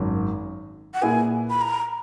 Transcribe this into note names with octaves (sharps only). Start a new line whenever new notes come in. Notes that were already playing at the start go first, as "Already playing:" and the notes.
Already playing: G#1 F#2
F#5
A#2 A#3 E4 G#4 B4 G#5
B5
A#5